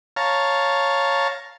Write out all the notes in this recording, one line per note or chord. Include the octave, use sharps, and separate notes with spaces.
C#5 F5 A5 A#5